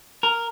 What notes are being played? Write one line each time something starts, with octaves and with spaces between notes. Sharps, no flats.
A#4